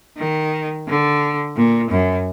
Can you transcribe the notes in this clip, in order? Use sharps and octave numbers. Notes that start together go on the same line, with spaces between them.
D#3
D3
A#2
F#2